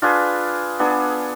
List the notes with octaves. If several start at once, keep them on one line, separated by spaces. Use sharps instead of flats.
D4 F4 G#4 B4
B3 D4 G#4